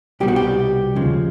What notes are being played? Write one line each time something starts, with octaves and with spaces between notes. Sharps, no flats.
C2 B2 G3 G4
F#4
G4
D#2 C#3 F3 G#3